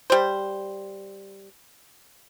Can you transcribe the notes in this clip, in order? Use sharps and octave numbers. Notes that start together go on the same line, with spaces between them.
G3 C5